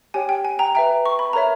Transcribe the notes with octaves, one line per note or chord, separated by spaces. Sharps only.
G4 C#5 G5 G#5
G5
G#5
G5 A#5
B4 E5 G5 A#5
C#6
B5
A#4 C#5 E5 A#5